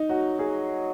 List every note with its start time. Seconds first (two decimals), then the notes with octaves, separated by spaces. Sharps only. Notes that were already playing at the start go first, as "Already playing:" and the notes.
Already playing: D#4
0.09 F#3 F#4
0.39 G#4